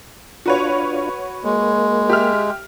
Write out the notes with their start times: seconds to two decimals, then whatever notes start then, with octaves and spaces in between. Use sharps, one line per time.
0.46 D4 F4 F#4 B4 C#5
1.44 G#3 A#3
2.09 G4 E5 F6